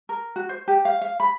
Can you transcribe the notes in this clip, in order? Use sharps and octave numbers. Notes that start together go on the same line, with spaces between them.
A#4
F#4
C5
G4
F5
F5
B5